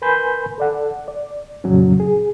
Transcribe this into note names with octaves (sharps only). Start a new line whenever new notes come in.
A#4 B4 G#5 B5 C6 G6
A4 D5 F#5
D5
F2 A#2 C#3 F#3 C#4
G#4